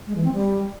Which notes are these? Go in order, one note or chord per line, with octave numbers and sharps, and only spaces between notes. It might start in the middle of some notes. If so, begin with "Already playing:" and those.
G#3
E3
C4
G3